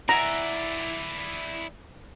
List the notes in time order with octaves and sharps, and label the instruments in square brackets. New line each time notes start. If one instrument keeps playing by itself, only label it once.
[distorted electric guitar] E4 D5 [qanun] E5 F#5 G#5 [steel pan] A#5